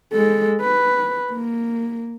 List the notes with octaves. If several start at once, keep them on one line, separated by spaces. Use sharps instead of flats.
G#3 A4
B4
A#3